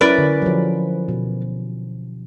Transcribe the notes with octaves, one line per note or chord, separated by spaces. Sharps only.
F#3 C#4 E4 A#4 B4 D5
D3
F3 F#3
B2